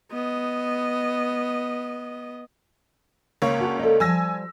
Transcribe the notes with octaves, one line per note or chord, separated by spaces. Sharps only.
B3 D#5
C#2 A#3 C#5
D4 F#4 G#4
A4 D5 D#5
F3 G3 G#5 E6 A#6